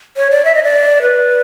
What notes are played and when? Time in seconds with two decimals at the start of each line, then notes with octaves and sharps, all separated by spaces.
0.17 C#5
0.31 D5
0.45 E5
0.55 D#5
0.63 D5
1.02 B4